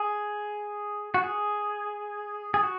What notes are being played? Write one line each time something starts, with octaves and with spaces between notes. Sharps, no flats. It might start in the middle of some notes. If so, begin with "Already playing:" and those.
Already playing: G#4
F#4
G#4
G#4
F#4